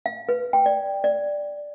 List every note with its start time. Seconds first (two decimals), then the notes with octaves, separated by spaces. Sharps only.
0.06 F5
0.29 B4
0.53 G5
0.66 D5
1.04 D5